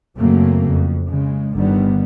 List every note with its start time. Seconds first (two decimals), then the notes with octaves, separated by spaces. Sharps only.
0.17 F#2 C#3 F#3 A3 A#3 C4
0.68 F2
1.06 C#3 G#3
1.54 G1 D3 D#3 G3 B3